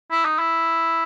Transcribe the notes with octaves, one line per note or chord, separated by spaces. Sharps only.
E4
D#4
E4